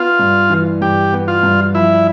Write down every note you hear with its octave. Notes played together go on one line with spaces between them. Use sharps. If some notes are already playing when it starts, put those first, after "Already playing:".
Already playing: B3 F4
G2
E3
G2 G4
B3
F4
G2
F3 E4